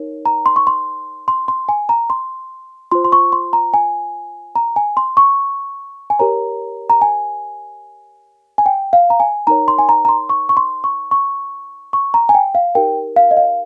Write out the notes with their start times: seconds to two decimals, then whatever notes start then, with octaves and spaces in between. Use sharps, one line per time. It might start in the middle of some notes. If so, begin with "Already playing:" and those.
Already playing: D#4 A#4 C#5
0.26 A#5
0.46 C6
0.56 C#6
0.67 C6
1.28 C6
1.48 C6
1.69 G#5
1.89 A#5
2.10 C6
2.92 F4 C5 C6
3.04 C6
3.12 C#6
3.33 C6
3.53 A#5
3.74 G#5
4.56 A#5
4.76 G#5
4.97 C6
5.17 C#6
6.10 G#5
6.19 G4 A#4 C#5 A#5
6.90 A#5
7.02 G#5
8.58 G#5
8.66 G5
8.93 F5
9.10 A#5
9.20 G#5
9.47 D#4 A#4 C#5 A#5
9.68 C6
9.79 G#5
9.89 A#5
10.05 A#5
10.09 C6
10.29 C#6
10.49 C#6
10.57 C6
10.84 C#6
11.11 C#6
11.93 C#6
12.14 A#5
12.29 G#5
12.35 G5
12.55 F5
12.75 D#4 G4 A#4 G5
13.16 F5
13.31 D#5
13.37 F5